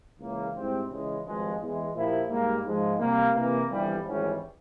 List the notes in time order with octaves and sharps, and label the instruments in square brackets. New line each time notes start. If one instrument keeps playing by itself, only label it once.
[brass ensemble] C#2 C#3 E3 A#3
G#2 G3 C4 E4 G4
C#2 C#3 E3 G#3
G#1 G2 F3 G#3
E2 E3 G#3
A#2 F3 A#3 E4 G4
G#2 G3 A#3
G#2 F3 G#3
C3 G3 A#3
C3 E3 A#3
G1 F2 E3 G3
G#1 G#2 E3 G3 C#4